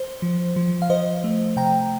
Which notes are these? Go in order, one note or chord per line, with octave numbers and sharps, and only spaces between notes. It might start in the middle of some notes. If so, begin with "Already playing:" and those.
Already playing: C5
F3
F3
F5
F3 C5 D#5
A3
C3 G5 A#5